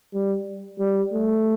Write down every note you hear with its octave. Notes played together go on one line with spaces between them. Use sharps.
G3
G3
A3